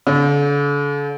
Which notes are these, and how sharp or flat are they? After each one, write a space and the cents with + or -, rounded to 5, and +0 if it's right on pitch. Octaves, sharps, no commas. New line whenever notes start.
D3 -40